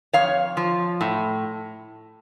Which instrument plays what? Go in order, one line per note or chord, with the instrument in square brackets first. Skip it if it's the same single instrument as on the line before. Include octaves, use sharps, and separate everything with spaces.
[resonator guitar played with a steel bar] F2 C#5 F5
F3
A2